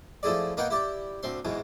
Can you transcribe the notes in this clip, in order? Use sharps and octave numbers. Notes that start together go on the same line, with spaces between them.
F3 A3 E4 G#4 D5
A#3 B3 D#4 A#4 F#5 G5
E4 G4 D5
D2 C4 C6
E2 G#2 B2 E3